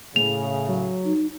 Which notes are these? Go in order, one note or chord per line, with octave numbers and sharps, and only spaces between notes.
A2 C#3 F7
F#3
D#4